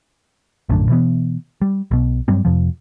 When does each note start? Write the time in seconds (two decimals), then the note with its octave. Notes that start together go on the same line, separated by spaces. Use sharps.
0.69 A#1 F#2 A2 D3
0.89 B2 E3 B3
1.61 G3
1.91 B1 B2
2.28 G2 F#3 G3 C4
2.45 F2 C3 F3